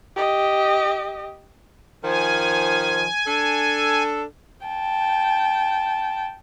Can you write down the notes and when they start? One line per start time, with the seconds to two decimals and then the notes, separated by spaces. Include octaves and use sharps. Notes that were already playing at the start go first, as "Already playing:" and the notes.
0.16 G4 D#5
2.04 D#3 F3 G#5
3.27 D4 A4
4.66 G5 A5